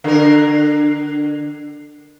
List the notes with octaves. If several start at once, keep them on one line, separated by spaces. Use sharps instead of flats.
D3 A#4